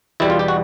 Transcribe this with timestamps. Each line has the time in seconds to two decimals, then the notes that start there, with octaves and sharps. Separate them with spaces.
0.20 E2 B2 G3 E4
0.30 F4
0.39 G4
0.48 F#4